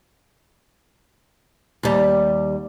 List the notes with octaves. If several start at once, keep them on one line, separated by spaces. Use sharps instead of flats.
D#2 G3